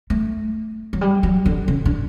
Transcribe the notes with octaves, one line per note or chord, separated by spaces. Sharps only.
A3
F#3
G3
F#3
D3
C#3
D3